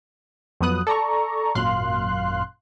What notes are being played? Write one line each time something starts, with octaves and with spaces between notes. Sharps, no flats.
F2 F#3 B3 D#6 F#6
A4 D5 A#5 C#6
G#1 F#2 A#2 F5 C6 F#6